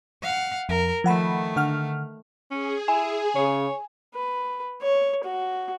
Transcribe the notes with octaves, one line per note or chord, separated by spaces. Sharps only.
F5 F#5
F2 A#4
D#3 F3 A3 F#5 B5
D3 F#5 F6
C#4 G#4
E4 G#5
C#3 C#5
B4
C#5
F#4